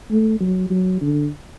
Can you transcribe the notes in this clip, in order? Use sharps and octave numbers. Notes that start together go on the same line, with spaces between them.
A3
F#3
F#3
D3